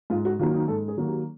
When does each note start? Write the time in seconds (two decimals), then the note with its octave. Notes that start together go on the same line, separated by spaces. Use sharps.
0.10 G#2 F4
0.25 F#4
0.39 D#3 F#3 A#3 F4
0.54 D#4
0.68 G#2 A4
0.88 G#4
0.97 D#3 F#3 A#3 F#4
1.07 G4